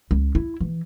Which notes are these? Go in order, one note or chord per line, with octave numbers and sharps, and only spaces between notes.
C#2
E4
E3